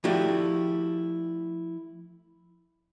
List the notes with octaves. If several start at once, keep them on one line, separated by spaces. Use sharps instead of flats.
F3 A3 E4 F#4 G4 D5